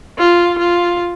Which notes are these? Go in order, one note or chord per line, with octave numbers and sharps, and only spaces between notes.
F4
F4